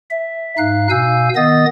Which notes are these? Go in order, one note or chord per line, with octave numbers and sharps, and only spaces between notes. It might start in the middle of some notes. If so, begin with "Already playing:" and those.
E5
G#2 D#4 F5 F#6
B2 F5 G#5 E6 G6
D#3 B3 D#5 D#6 A6